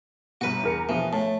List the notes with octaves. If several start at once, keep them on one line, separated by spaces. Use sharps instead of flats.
G1 B2 F#4 B4
E2 A#4 C#7
B2 E3 F3
A2 A5